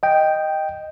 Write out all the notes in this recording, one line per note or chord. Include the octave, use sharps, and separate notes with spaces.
D#5 G5